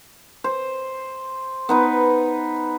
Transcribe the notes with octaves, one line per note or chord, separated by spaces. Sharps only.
C5
B3 D#4 B4